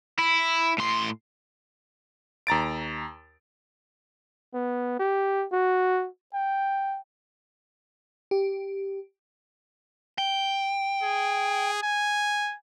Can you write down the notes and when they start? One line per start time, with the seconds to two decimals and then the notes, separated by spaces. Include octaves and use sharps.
0.19 E4
0.78 A2 C6
2.47 D#2 A#5 A6 D7
4.54 B3
4.99 G4
5.52 F#4
6.34 G5
8.31 G4
10.18 G5
11.03 G#4
11.83 G#5